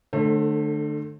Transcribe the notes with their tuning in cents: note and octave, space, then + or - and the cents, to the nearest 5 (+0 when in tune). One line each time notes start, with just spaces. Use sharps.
D3 +30 A3 +0 C5 +35